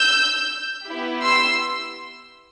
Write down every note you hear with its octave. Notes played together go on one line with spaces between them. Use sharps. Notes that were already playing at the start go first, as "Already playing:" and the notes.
Already playing: E6 G6
B3 E4 G4
C6 E6